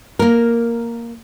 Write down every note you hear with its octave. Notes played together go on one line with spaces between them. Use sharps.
A#3 A#4